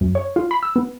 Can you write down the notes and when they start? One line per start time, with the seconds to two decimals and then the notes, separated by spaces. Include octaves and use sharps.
0.01 F#2
0.15 C#5
0.36 F4
0.51 B5
0.63 E6
0.76 B3